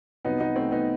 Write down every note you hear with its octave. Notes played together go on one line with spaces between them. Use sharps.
C2 C3 F#3 B3 D#4
B3 D#4
A3 C4
B3 D#4